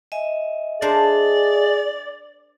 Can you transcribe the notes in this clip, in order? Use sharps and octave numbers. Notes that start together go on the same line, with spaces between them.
D#5 E5 G#5
D4 G#4 A#4 C5 D5